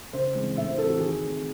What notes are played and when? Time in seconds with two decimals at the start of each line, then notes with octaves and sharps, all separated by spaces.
0.13 C#3 C5
0.35 E3 G#3 C4
0.56 A2 E5
0.68 C5
0.78 E3 A3 C4 A4
0.89 F#4
1.00 D#3 G#4
1.21 A3 C4